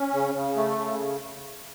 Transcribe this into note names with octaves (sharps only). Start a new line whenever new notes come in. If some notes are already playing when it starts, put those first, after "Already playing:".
Already playing: C#4
C#3
C#3
A3
C#3